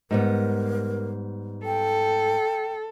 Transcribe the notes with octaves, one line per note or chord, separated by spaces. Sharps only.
G#2 G3 B3 A#4
A4 G5